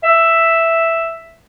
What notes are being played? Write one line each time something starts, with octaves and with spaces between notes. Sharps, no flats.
E5